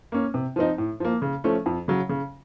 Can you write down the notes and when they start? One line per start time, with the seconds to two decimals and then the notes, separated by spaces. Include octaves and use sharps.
0.12 A#3 C#4
0.34 C3
0.56 F3 C4 D#4
0.78 A2
1.00 F3 A#3
1.22 C#3
1.44 F3 A3 C#4
1.66 F2
1.88 C#3 F#3
2.09 C#3